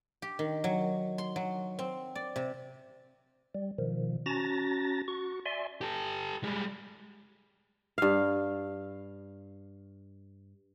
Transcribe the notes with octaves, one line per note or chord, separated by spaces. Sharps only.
G4
D#3
F#3
C6
F#3
C4
D5
C3
G3
B2 D#3 F3
C#4 F#4 A5 A#5 A6 A#6
F#4 C#6
D5 E5 G#5 C6
G4 A4
G3 G#3
G2 F5